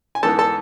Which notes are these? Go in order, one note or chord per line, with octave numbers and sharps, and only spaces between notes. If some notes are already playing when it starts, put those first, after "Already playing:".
G#5
G#2 E3 B3 A4 A5
A4 A5